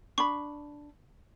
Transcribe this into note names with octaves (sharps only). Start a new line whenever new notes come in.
D4 B5 C#6